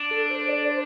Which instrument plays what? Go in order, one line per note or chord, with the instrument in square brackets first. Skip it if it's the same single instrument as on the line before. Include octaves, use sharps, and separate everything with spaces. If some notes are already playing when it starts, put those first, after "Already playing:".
Already playing: [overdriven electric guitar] D4
[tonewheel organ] A4
C5
D5
C5